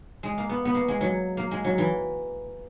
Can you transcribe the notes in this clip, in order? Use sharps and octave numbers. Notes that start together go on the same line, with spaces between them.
G#3
A#3
B3
B3
A#3
G#3
F#3
A#3
G#3
F#3
E3